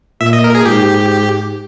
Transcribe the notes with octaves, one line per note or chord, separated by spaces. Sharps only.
A#2 E5
D#5
A#4
G#4
G#2 G4